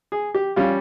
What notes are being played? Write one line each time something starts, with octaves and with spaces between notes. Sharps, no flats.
G#4
G4
G3 C#4 F4